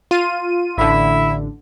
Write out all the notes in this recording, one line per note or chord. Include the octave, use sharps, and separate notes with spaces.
F4 D#7
A1 D3 E4 E5